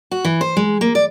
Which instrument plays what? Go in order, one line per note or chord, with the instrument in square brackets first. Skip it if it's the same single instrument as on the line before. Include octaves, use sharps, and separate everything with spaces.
[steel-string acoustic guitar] F#4
E3
C5
G#3
A#3
D5